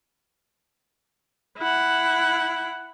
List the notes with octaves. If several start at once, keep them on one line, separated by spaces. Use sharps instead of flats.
E4 F#5